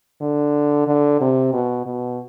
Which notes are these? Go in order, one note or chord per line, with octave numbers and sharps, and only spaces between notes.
D3
D3
C3
B2
B2